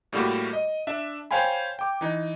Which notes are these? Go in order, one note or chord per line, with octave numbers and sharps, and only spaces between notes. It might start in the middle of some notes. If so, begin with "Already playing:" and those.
A2 G3 A3 A#3 F#4 G4
D#5
D4 E5
C5 C#5 F5 G5 G#5 B5
G5 D6
E3 D#4